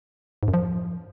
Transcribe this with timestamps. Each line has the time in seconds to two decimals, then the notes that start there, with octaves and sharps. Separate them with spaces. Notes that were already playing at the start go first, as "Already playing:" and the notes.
0.43 G#2
0.48 F#2
0.54 F3